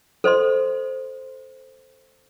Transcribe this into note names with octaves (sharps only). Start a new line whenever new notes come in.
A4 C5 D#5 C6